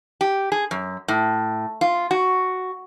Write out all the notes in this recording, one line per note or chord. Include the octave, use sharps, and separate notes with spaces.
G4
G#4
F#2
A2
F4
F#4